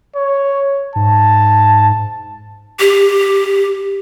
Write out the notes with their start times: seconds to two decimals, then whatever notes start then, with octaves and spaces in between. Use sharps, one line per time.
0.16 C#5
0.96 G#2 A5
2.80 G4